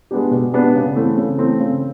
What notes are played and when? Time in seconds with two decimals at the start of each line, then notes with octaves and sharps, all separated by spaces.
0.11 G#3 B3 D4 G4
0.31 B2
0.52 G#3 B3 D4 G4
0.75 C#3
0.95 E3 A3 C4
1.17 C#3
1.38 E3 A3 C4
1.60 C#3